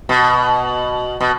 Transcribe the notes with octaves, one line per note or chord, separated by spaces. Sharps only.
B2
B2